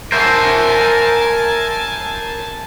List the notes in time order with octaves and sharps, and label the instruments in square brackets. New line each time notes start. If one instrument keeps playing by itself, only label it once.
[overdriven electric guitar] A#4 E5 [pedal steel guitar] C5 [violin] G#5 A5